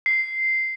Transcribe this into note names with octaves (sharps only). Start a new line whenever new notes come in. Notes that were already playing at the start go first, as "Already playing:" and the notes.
C7